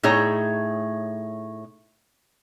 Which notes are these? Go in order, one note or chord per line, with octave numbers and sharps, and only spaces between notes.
A2 A3 D#4 G#4 C#5